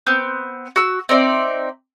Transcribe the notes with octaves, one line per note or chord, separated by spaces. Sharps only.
B3 C4 G6
F#4 E6
C4 D#4 D5 E5